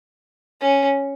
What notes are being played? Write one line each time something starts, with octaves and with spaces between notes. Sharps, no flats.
C#4